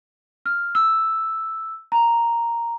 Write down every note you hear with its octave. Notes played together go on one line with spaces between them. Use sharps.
F6
E6
A#5